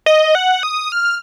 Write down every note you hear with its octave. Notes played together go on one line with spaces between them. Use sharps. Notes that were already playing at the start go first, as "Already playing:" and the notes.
D#5
F#5
D#6
F6